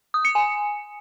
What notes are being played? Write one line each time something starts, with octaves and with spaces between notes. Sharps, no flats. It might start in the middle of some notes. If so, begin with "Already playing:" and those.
D#6
C#7
G#5